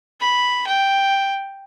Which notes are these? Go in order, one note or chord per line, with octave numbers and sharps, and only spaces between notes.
B5
G5